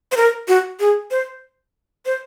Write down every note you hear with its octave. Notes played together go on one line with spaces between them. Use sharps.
C5
A#4
F#4
G#4
C5
C5